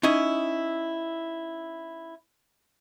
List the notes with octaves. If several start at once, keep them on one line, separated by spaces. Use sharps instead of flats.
C#4 D#4 E4 D#5